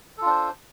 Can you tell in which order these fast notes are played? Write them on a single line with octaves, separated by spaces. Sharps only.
A4 F4 D4 C5